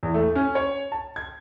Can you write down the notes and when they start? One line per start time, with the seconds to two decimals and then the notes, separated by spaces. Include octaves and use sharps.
0.03 E2
0.14 A3
0.35 C#4
0.55 C#5
0.92 A5
1.16 G#6